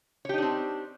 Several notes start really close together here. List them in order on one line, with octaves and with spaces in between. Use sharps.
C#5 G4 D#4 D4 C4